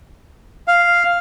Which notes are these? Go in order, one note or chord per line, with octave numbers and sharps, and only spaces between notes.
F5